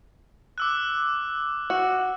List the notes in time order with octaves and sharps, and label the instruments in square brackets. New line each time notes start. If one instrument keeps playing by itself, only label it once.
[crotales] D6 E6 F#6
[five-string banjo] F#4